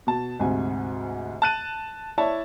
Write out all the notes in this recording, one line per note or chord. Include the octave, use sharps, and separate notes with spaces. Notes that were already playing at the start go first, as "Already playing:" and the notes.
B2 A5
D2 G#2 C3 G#5
A5 F#6 D#7
E4 C#5 D5 A5